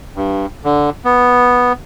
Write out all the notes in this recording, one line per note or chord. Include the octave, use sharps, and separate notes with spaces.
G2
D3
B3